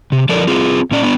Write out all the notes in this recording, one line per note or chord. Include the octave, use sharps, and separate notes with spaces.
C3
F3 A4 A#4 D5
C4 F4 G#4
A#2 C#4 D5
B3 D4